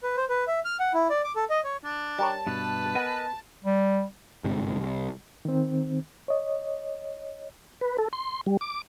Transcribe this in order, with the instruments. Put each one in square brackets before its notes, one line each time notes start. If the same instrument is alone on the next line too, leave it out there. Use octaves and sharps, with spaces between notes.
[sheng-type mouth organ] B4
C5
B4
E5
F6
F#5
E4
D5
D6
A4
D#5
C#5
[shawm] D4
[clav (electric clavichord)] G3 A#4 C#5 [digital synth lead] A5
[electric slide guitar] G2 B2 [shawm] B4
[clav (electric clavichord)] B3 [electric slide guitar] A#4 D#5 G#5
[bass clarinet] G3
[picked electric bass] G1 G#2 C3
C2
[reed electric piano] D#3 C4
C#5 D#5
[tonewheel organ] B4
A4
C6
G3
D6